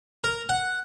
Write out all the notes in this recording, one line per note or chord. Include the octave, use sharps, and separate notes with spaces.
A#4
F#5